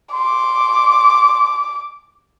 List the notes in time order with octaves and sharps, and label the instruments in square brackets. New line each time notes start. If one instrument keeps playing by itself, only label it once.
[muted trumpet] C6 [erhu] D6